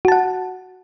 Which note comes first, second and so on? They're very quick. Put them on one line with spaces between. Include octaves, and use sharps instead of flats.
F#4 A5 F#5